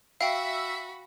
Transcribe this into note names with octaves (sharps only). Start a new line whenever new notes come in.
F#4 E5 F5 G5 B5